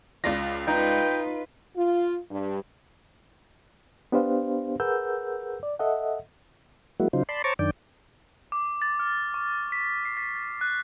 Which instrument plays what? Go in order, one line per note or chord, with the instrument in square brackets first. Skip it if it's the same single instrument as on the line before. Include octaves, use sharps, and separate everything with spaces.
[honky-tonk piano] C#2 D5 A#6 [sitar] F4
[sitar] D#4 [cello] F4 B4 [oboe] G5
[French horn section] F4
G2
[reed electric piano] B3 D4 G4 B4 C5 F5
G#4 A#4 B4 F#5 E6 G6
D5
A4 D#5 E5 F#5
[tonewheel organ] F#3 G#3 A#3 E4 F#4
C#3 F#3 D#4 F4 C5
D5 A5 B5 C6
C5 C#5 A5 A#5 C#6 D6
F#2 D#3 D4 D5 G5
[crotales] D6
A6
F6
C#6
B6
C7
B6
A6
F#6